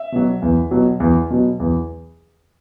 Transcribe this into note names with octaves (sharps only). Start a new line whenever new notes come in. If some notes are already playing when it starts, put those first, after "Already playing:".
Already playing: E5
B2 F#3
E2
B2 F#3
E2
B2 F#3
E2